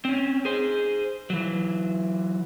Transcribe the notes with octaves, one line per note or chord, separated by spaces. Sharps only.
C4 C#4
G#4 C5
E3 F#3